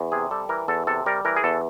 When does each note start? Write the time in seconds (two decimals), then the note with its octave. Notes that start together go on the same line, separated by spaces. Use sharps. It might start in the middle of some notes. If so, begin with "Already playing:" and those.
Already playing: E2
0.12 C3 G#4
0.31 G3 A4
0.49 E3 A#4
0.68 E2 A4
0.87 C3 A4
1.06 G3 A#4
1.25 E3 A#4
1.36 G#4
1.44 E2 A4